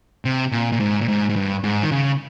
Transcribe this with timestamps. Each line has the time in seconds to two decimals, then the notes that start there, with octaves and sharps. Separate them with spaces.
0.25 C3
0.52 A#2
0.72 A#2
0.80 G#2
1.01 A#2
1.09 G#2
1.30 G#2
1.36 G2
1.64 G#2
1.83 D#3
1.91 C#3